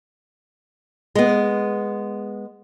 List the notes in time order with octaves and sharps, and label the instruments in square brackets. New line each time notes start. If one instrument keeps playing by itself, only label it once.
[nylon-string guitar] G#3 B3